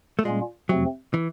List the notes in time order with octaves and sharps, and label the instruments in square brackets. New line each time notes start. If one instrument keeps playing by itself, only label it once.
[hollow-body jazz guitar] A3
[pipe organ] A#2 G3 A#3 C#4 F4 [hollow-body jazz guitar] G#3
[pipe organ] F2 C3 F3 A3 C4 [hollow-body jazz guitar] F#3
[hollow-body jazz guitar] E3